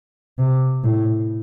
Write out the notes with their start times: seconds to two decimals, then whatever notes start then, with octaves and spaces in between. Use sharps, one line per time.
0.38 C3
0.84 A2